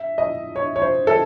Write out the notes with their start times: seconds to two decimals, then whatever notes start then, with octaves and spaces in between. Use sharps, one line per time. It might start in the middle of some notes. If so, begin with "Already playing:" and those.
Already playing: E5
0.18 D#5
0.56 C#5
0.76 C#5
0.82 C5
1.07 A4